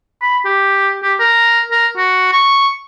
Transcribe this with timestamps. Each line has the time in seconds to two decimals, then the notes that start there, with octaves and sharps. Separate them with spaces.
0.22 B5
0.46 G4
1.03 G4
1.20 A#4
1.71 A#4
1.97 F#4
2.33 C#6